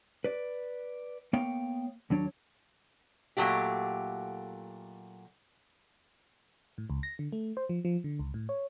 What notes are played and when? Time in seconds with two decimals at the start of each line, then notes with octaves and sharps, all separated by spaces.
0.24 B4 D5
1.33 A#3 B3 C#5 F5 G5
2.10 D#2 F#3 D4 C#5
3.37 A#2 C#3 F#3 A3 G4
6.78 A2
6.90 C#2
7.03 A#6
7.19 D3
7.32 A3
7.57 C5
7.69 F3
7.85 F3
8.04 D3
8.19 C#2
8.34 A2
8.49 C#5